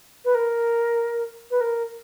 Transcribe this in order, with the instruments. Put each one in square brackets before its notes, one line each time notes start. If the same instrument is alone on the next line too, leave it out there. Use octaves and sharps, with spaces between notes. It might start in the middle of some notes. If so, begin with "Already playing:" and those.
[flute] B4
A#4
B4
A#4